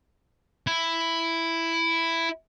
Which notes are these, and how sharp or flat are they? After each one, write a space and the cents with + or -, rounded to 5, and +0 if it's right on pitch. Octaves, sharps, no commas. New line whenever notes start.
E4 +5